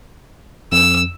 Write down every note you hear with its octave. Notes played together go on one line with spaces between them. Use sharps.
F2 E6